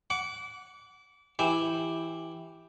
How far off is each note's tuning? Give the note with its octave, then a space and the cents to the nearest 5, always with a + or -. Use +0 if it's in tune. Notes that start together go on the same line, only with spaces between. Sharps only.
F#5 +0 D6 -30
E3 +0 G4 +0 E5 -15